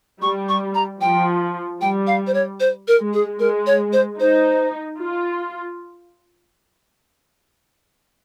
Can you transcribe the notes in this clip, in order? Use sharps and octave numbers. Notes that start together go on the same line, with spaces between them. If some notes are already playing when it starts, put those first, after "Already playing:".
G3 C#6
C#6
A#5
F3 G5
G3 G5
F5
C5
C#5
C5
A#4
G#3
G#4
G#3 A#4
C#5
C5
D#4 C5
F4